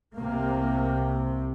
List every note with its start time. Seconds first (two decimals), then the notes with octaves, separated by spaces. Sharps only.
0.17 C2 C3 A#3